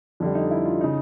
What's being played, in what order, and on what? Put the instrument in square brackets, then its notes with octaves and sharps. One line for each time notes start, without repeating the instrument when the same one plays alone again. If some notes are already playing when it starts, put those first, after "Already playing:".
[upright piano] F2 D3 G3 D4
D#4
E4
F4
C#3 D#4